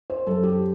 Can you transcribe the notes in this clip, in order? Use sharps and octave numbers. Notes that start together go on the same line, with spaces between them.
C5
F#2 A4
G4